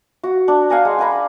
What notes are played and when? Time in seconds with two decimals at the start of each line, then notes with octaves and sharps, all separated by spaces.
0.23 F#4
0.48 D4
0.70 F5 F#5 G#5 A#5
0.85 G#3
0.99 G5 G#5 A#5 B5